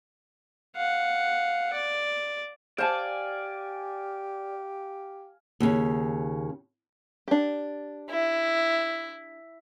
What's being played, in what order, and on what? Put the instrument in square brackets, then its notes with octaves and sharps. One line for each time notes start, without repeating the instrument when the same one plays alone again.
[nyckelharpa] F5 F#5
D5
[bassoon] G4 [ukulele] C5 A5 [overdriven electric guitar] D5 [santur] F5 G#5
[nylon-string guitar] D#2 C#3
[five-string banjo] D4 G4
[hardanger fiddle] E4